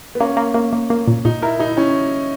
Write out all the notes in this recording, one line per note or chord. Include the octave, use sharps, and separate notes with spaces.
B3
A#3 C#4
A#3
A#3
A#3
A#3
A#2
A#2 D#4
E4 A#4
D#4 E4
C#4 E4